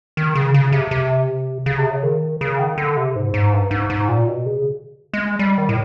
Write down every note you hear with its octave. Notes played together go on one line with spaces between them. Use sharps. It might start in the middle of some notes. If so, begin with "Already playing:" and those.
D#3
C#3
C#3
C3
C3
C#3
C3
C#3
D#3
C#3
D#3
D3
C3
G#2
G#2
G2
G#2
G#2
A#2
B2
C#3
G#3
G3
D#3
A2